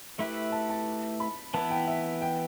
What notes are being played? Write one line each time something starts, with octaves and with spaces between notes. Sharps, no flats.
A3 E4 G4 B4 E5
A5
A5
B5
E3 B3 E4 A5
G5
E5
G5